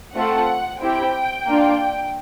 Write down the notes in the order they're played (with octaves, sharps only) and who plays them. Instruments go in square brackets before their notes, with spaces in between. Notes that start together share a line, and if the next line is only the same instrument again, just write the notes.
[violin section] A3 C4 F4 A4 F#5
C4 E4 G4 G5
A#3 D4 F4